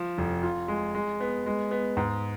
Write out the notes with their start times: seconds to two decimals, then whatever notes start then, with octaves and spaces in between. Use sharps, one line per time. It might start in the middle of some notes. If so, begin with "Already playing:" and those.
Already playing: F3
0.18 F1
0.43 F4
0.68 G#3
0.95 G#3
1.20 B3
1.46 G#3
1.71 B3
1.97 G#2